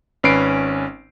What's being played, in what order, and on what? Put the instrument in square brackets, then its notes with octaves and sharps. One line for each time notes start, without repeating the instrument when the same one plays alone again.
[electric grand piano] G#1 C#4 B4 C7 D7